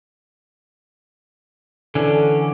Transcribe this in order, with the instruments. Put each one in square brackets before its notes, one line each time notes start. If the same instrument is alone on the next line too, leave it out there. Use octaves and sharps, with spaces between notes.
[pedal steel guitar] D3 E3 C#4 [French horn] A4